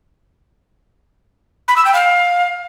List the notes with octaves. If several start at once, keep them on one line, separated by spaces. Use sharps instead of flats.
B5
E6
G5
F5